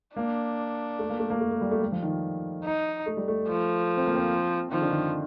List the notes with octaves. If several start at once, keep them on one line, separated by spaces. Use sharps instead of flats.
A#3 D4
A3
A#3
A3
A#3
A3
A3
G3
A3
G3
F3
D#3
D#4
A3
G3
A3
F3
C4
A#3
C4
D#3 F3
D3
D#3